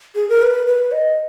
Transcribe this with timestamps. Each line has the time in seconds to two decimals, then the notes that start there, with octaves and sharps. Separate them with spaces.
0.15 G#4
0.29 A#4
0.42 B4
0.67 B4
0.92 D#5